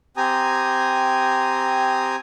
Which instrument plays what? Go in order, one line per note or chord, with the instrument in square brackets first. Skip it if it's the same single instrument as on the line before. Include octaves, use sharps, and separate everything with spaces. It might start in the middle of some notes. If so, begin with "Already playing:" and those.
[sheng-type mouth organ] C4 G4 G#5 A#5 D#6